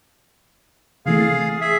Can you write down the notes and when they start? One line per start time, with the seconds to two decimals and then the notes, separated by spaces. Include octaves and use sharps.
1.06 C3 E3 A3 G#4 F5
1.20 A6
1.61 G#4 E5